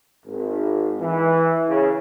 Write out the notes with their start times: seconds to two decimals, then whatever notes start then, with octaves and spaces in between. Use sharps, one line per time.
0.25 G#1
1.00 E3
1.68 C#3